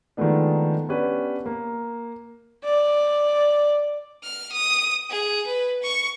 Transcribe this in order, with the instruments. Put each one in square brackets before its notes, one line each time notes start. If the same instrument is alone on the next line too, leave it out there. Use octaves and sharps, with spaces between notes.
[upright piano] D#3 F3 G#3 A3 B3 D4
B3 C#4 D4 G4 B4
A#3
[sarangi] D5
[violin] F6
D#6
G#4
B4
C#6